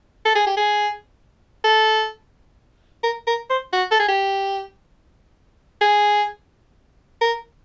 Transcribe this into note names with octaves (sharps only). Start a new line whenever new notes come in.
A4
G#4
G4
G#4
A4
A#4
A#4
C5
F#4
A4
G#4
G4
G#4
A#4